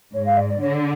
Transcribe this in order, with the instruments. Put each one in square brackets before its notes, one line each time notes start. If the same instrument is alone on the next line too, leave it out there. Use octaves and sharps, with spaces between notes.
[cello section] G#2 [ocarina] C#5
[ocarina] F5
D5
D5
[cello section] D3 [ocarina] C#5
[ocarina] D5